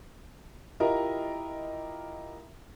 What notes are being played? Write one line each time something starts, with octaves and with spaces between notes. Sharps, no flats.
E4 F4 G4 A#4 D#5 A#5